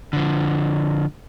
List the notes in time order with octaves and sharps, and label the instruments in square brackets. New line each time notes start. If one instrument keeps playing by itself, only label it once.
[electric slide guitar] D3 F3